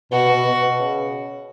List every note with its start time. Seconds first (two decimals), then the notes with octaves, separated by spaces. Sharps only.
0.12 B2 F#4
0.29 B2
0.45 B2
0.61 B2
0.79 C#3